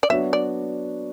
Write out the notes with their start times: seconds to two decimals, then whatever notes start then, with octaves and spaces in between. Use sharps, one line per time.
0.03 D5
0.09 F#3 B3 D4 F#4 C#5 E5
0.33 D5